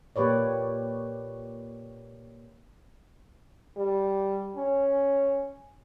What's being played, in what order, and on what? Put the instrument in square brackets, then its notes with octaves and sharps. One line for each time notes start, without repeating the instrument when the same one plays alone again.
[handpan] A#2 A#3 G4 B4 C#5 D5
[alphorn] G3
C#4